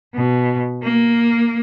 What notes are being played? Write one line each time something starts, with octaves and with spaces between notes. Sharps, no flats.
B2
A#3